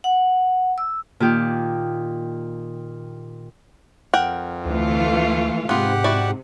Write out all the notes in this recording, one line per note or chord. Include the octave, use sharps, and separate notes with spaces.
F#5
E6
A#2 D#3 G4
F2 A#4 F#5 G5
D2 E3 A3 F4
G#2 C3 B3 F4 G4 F#5
E4 F#4 D5